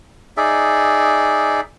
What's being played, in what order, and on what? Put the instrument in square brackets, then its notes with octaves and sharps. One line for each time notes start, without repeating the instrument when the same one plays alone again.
[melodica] D#4 G#4 D5 E5